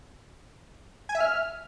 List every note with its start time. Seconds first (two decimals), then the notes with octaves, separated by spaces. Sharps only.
1.09 G#5
1.15 E5
1.21 F6